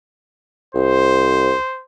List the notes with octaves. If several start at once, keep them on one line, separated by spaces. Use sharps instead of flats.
C2 C5